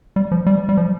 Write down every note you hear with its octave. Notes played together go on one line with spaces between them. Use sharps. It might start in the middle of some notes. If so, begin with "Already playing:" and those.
G3
F3
G3
G3
F3